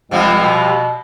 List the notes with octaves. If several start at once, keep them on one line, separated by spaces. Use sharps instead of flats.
C#2 C3 F3 G3
B2